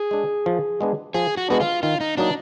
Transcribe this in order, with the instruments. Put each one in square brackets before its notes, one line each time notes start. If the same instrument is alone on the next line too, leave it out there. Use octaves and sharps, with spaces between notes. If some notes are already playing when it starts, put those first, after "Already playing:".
Already playing: [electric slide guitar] G#4
[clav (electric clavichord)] G#3 D4
F3
G#3 B3 D4
[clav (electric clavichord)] F3 [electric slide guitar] G#4
[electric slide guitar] F#4
[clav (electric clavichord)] G#3 B3 D4 [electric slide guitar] F#4
[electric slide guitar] F4
[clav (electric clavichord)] D#3 [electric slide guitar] F4
[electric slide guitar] D#4
[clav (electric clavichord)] F#3 A#3 D#4 [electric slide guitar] D4